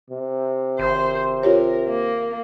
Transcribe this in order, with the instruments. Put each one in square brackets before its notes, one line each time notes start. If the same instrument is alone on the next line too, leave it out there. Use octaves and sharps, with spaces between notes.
[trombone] C3
[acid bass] G#1 [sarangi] C5
[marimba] F4 G4 C#5 [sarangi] A#4
[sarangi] A#3